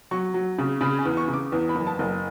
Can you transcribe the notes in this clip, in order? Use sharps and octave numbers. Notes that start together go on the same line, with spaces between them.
F#3 C#6
F#3
C#3
C#3 B5
G#5
E2
C#6
C#3
D6
E2
B5
F#1
A5
F#1